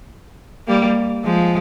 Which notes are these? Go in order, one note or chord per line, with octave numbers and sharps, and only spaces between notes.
G3 A#3
F3 G#3